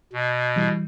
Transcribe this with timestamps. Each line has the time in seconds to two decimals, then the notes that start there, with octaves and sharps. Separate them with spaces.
0.13 B2
0.56 E3 G3